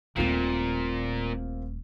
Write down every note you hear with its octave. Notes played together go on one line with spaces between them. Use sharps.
D#1 A#2 A3 A#3 C4 F4